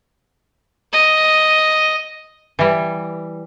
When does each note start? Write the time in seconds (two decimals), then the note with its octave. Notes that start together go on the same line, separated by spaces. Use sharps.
0.92 D#5
2.59 E3 G3